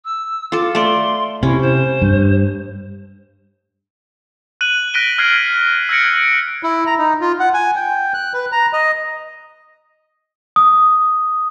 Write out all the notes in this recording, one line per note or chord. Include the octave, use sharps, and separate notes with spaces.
E6
F4 A4 D6
A3 D5 C6
C3 C#4 E4
C5
G2
F#6 D#7 F#7
F#6 A#6 B6 D7 D#7 G7
F6 F#6 G#6 C7
E6 F#6 G#6 A#6 C#7 D7
E4
A#5
D#4
F4
F#5
G#5
G5
F#6
B4
A#5
D#5
D#6